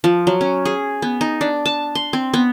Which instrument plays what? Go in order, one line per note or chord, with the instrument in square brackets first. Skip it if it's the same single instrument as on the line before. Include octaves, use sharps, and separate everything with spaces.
[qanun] F3
F#3
C#4
G#4
B3
D#4
D4
A5
C6
C4
B3